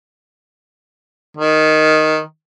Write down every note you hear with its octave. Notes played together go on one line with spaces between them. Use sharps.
D#3